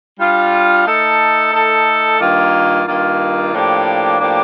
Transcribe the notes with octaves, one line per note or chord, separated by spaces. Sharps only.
G3 D4 F4
A3 D#4 A4
A3 D#4 A4
G2 D#3 A#3 F4
G2 D#3 A#3 F4
A2 F3 A#3 D4 G4
A2 F3 A#3 D4 G4